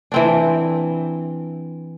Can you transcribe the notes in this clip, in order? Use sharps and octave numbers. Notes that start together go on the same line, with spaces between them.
E3 C4 D4